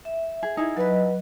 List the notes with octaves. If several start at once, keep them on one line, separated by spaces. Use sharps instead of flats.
E5
G#4
D#4 E4 G#4
F#3 B4 D#5